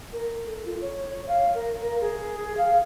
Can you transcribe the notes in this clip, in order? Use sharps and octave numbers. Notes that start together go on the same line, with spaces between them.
A#4
A4
F4
C#5
C#5
F5
A#4
A#4
G#4
F5